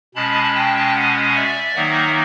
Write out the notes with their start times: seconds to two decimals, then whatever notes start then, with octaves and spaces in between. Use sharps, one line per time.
0.15 B2 G#3 C#4 A5 B5
0.55 G5 A5
0.95 F#5 G#5
1.36 D5 E5
1.76 D#3 F#3 A#3 D#4 E5 F#5